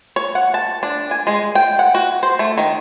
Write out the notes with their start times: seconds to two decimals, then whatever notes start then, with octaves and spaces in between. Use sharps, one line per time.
0.16 C#5
0.35 F#5
0.54 A5
0.83 D4
1.11 G#5
1.27 G#3
1.55 G5
1.79 F#5
1.95 F#4
2.23 C5
2.39 A3
2.58 D#3